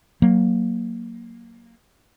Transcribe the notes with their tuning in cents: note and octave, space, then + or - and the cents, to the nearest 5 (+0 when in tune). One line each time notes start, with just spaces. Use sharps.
F#3 +0 A#3 +0